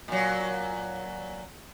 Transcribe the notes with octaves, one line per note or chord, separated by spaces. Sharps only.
A#2 F#3